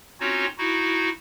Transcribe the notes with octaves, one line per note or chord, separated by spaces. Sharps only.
C4 C#4 D#4 F4 F#4 C#5
D#4 E4 F#4